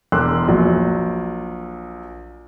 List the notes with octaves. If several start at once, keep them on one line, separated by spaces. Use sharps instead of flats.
E1 C6 D6 E6 F#6
A#1 F#3